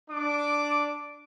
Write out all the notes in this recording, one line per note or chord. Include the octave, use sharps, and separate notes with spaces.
D4 D6